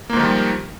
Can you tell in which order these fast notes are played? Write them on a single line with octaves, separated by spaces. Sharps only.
A#3 G#2 F3 D#3 G3